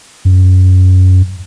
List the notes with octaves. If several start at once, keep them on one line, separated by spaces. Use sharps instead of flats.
F#2